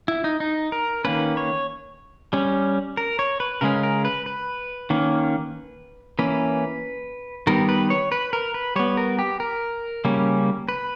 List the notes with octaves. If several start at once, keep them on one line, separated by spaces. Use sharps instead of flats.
E4
D#4
D#4
A#4
D#3 A#3 C#4 B4
C#5
G3 C#4
A#4
C#5
B4
C#3 G#3 C#4 A#4
A#4
B4
B4
D#3 A#3 C#4
E3 A#3 C#4 B4
D#3 G3 B3 A#4
B4
C#5
B4
A#4
B4
G3 B3 C#5
A#4
G4
A#4
C#3 G3 A#3 C#4
B4